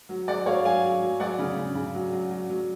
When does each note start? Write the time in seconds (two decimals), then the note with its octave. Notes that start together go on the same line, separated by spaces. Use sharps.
0.09 F#3
0.28 F#3 D5 F#5
0.46 F#3 C#5 F5
0.65 F#3 F5 G#5
0.84 F#3
1.02 F#3
1.20 F#3 D5 F#5
1.39 C#3
1.57 C#3
1.75 C#3
1.94 F#3
2.13 F#3
2.31 F#3
2.50 F#3